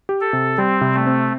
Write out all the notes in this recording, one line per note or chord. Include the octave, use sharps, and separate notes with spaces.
G4
A4
C3
G3 C4
C3
A3
C4